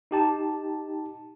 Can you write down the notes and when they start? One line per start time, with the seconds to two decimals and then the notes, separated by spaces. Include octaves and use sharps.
0.11 D#4 G4 A5